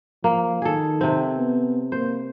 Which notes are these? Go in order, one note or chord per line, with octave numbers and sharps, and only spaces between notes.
F3 A#3
D#3 G#4 A4
C3 C4
B3
A#3 C5